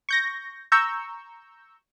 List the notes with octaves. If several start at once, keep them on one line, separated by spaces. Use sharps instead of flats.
C#6 G6 A#6
A#5 C#6 E6 G6